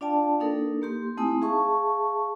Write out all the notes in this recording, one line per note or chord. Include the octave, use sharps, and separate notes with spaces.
D4 F4 D5 F5 G5 A5
A#3 D4 D#4 A4 A#4
A#3 G4 C6
A3 C4 D#4 E4 G#5 D#6
G#4 E5 F5 A5 C#6